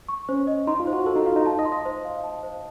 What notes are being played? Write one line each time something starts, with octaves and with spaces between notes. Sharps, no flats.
C#6
C#4 C5
D#5
D#4 C6
F4
C5
F#4
A4 C5
D#4
F4 F5
D#4
A5
D#5
C6
D#5
C5
F5
A5
C5